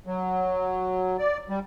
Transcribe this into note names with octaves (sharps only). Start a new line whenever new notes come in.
F#3
D5
G3